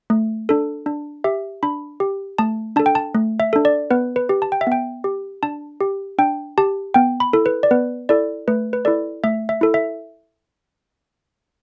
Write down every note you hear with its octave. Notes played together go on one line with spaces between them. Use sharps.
A3
D4 A4
D4
G4 E5
D4 B5
G4
A3 A5
D4 A4 A5
G5
A5
A3
E5
D4 A4
D5
B3 B4
B4
G4
A5
G5
E5
B3 G5
G4
D4 A5
G4
D4 G5
G4 A5
B3 G5
B5
E4 A4
B4
D5
B3 B4
E4 A4 D5
A3 B4
B4
E4 A4 D5
A3 E5
E5
E4 A4
E5